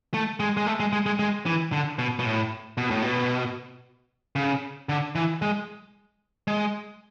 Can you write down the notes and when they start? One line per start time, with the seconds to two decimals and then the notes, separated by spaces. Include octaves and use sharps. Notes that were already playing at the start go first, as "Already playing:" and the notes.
0.14 A3
0.40 G#3
0.57 G#3
0.67 A3
0.80 G#3
0.93 G#3
1.06 G#3
1.19 G#3
1.46 E3
1.72 D3
1.99 B2
2.19 B2
2.25 A2
2.78 B2
2.91 A2
3.02 B2
4.36 C#3
4.89 D3
5.15 E3
5.42 G#3
6.47 G#3